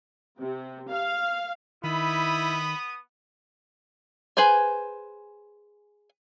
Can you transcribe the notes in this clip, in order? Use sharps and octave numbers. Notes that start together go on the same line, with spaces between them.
C3
F5
D#3 B3 E4 B5 D#6
G#4 B4 C5 G#5